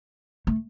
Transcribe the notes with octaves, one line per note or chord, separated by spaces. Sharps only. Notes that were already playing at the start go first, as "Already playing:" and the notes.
A3